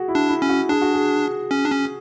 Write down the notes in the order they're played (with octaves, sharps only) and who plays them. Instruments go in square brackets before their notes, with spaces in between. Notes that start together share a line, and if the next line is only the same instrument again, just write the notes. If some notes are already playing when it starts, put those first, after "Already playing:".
Already playing: [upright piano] F#4 G#4
E4
[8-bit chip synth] D4
[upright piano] E4
[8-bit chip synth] C#4
[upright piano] F#4
[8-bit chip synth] D4 [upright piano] G#4
[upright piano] F#4
G#4
[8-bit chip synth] C#4
D4
C#4